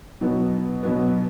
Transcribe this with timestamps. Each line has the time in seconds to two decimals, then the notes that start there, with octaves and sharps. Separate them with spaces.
0.21 B2 F#3 B3
0.83 B2 F#3 B3